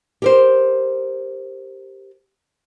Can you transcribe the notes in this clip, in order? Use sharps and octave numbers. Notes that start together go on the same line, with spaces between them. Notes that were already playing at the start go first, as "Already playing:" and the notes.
G4 A#4 C5